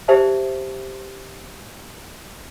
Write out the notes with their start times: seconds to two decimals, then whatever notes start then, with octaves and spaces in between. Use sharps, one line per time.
0.08 G4 C5 D5 E5 G5 A5